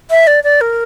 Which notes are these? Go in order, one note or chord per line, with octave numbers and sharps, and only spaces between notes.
E5
D5
D5
A#4